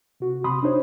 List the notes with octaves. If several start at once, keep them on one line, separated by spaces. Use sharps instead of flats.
C3 F#4
C3 B5 C6 D#6
D4 D#4 C5 C#5